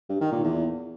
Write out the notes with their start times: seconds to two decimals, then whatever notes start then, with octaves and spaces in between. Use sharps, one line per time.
0.09 G2
0.21 D#3
0.32 A#2
0.43 E2